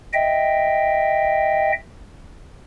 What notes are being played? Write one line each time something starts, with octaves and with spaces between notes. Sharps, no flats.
D#5 E5 G5